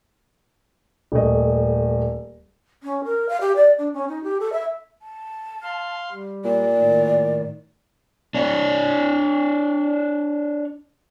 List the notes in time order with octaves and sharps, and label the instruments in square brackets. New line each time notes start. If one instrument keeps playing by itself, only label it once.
[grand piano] D#1 A3 D#5
[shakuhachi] C#4
A#4
F5
G4
D5
D4
C#4
D#4
G4
A4
E5
[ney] A5
[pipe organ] F5 C6
G3
[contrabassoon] A#2 [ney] D5
[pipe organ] A2 D#3
[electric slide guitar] D4 C#5 D5